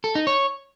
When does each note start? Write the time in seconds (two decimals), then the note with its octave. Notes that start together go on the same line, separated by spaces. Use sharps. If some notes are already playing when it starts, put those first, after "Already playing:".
0.04 A4
0.15 D#4
0.27 C#5